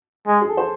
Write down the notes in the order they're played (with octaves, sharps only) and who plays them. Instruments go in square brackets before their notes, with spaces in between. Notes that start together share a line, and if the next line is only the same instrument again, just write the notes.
[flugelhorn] G#3
[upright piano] G#4
A4
C5